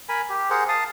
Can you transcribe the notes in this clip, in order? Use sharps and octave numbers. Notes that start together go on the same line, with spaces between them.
A#4 G#5 B5
G4
G#4 A#4 C5 F#5
F5 A5 D#6